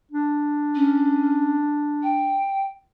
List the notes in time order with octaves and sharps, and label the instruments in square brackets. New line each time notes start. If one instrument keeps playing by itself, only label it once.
[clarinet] D4
[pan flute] C#4
G5